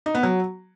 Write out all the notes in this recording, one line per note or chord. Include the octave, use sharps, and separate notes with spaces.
D#4
B3
F#3